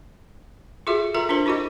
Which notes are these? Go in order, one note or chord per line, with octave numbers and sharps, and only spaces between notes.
F4 F#4 G#4 A4 E5
F4 A4 A#4 E5 A#5
D4 F4 A#4 C5
E4 F#4 G4 A4 D#5